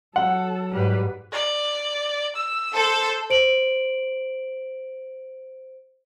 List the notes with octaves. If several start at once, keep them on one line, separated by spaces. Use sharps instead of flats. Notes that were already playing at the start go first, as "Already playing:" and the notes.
F#3 A4 F#5
G#2 G3 B4
D5
E6
A4 C5
C5 D7 F#7